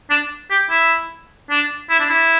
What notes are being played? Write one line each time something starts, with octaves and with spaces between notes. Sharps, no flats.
D4
G4
E4
D4
E4
D4
E4